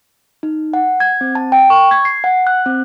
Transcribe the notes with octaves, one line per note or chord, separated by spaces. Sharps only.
D#4
F#5
G#6
C4
A5
G5
C#6
G#6
C7
F#5
F#6
C4